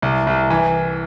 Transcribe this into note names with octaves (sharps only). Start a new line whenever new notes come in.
C2
C2
E3